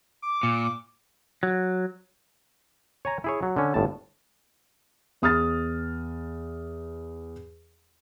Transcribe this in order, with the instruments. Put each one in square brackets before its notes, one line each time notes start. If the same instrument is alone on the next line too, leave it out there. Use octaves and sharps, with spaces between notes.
[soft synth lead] D6
[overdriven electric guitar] A#2
[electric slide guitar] F#3
[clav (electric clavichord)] C#5 G#5 A#5
E4 G#4 C#5
F#3
D3 C#4
G1 A2 A5
[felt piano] E2 D#6 F6 A6